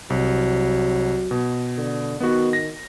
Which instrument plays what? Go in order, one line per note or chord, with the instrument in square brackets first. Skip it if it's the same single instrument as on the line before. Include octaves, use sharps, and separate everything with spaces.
[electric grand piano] C2 [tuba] F#3
[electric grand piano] B2
[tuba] D3
[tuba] D#3 [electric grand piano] B3 F#4
[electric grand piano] A#6